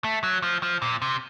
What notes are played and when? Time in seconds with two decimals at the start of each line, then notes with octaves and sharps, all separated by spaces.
0.04 A3
0.23 F#3
0.43 F3
0.63 F3
0.82 A#2
1.02 C3